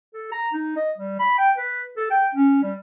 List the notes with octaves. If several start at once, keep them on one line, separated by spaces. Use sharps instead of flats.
A4
A#5
D#4
D#5
G3
B5
G5
B4
A4
G5
C#4
G3